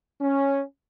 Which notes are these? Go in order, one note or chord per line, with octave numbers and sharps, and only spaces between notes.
C#4